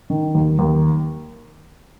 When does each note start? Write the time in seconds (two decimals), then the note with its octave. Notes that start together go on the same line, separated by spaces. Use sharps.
0.10 D#3
0.35 D#2
0.59 D#2